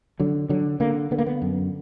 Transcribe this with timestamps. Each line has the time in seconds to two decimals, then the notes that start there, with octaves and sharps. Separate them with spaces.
0.20 D3 F#3
0.49 D3 F#3
0.80 D3 A#3
1.11 D3 B3
1.18 A#3
1.26 B3
1.42 F#2